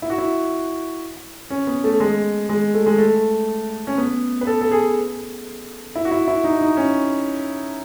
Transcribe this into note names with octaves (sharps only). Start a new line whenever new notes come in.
E4
F#4
E4
C#4
B3
A3
G#3
G#3
A3
G#3
A3
C#4
B3
B4
A4
A4
G#4
E4
F#4
E4
E4
D#4
D#4
C#4